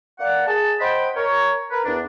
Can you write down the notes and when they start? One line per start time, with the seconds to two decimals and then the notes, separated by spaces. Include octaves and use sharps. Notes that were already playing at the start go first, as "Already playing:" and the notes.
0.20 A#3 D5 F#5
0.47 G#4 A5
0.80 C5 D#5 F#5 G5 B5
1.16 A#4 C#5
1.71 A#4 B4
1.85 E2 D4